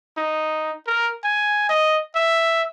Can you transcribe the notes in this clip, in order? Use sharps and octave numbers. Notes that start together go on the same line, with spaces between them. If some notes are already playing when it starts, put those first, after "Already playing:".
D#4
A#4
G#5
D#5
E5